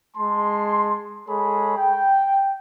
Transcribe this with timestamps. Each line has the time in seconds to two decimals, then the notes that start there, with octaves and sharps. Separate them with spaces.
0.15 G#3 A5 C6
1.27 G#3 G#4 A4 C#5 B5
1.76 G5